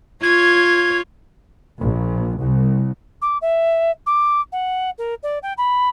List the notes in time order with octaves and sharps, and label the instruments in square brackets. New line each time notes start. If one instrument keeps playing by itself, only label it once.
[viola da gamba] F4 C#5 [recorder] G#6
[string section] A#1
C2
[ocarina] D6
E5
D6
F#5
A#4
D5
G5
B5